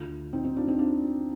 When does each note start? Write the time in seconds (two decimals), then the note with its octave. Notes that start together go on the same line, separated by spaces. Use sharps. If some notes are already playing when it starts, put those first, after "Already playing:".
Already playing: D2 D3 A3 F4
0.33 C4 D#4
0.45 C4 D#4
0.57 D4 F4
0.68 C4 D#4
0.79 D4 F4